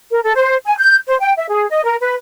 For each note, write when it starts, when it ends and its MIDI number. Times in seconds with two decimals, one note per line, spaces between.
0.11 0.20 70
0.23 0.33 69
0.35 0.56 72
0.65 0.75 80
0.77 0.96 91
1.07 1.15 72
1.20 1.32 79
1.37 1.45 76
1.49 1.66 68
1.69 1.83 75
1.83 1.95 70
1.99 2.15 71